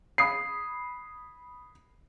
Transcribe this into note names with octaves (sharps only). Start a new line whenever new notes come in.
B5 D#6 C7